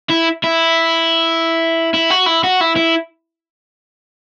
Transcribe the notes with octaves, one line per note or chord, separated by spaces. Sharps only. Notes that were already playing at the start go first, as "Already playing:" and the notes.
E4
E4
E4
F#4
E4
F#4
E4
E4